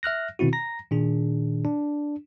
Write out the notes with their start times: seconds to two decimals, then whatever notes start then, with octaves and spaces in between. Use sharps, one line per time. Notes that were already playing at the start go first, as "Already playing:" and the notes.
0.03 E5 F6 F#6 A#6
0.39 B2 D#3 C4 E4 F#4
0.53 A#5 A#6
0.91 A#2 D#3 D4 G#4
1.65 D4